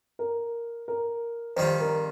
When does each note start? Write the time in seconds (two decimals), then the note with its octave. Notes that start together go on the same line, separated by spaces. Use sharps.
0.19 A#4
0.88 A#4
1.56 F2 D#3 G3 C4 F4 C5
1.80 A#4